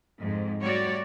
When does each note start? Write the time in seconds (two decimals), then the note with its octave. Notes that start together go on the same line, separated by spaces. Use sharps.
0.18 F2 G#2
0.63 G3 A3 F#4 C#5 D5